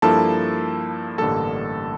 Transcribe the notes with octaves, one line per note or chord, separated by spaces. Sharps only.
G2 F3 A#3 E4 A4 A5
A1 G2 D3 G3 A#3 A4 A5